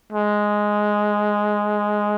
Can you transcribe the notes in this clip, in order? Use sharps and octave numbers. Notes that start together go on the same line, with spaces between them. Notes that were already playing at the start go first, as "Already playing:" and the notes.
G#3